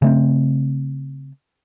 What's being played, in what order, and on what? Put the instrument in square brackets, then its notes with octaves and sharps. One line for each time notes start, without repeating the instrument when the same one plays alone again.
[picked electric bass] C#3 A3 C4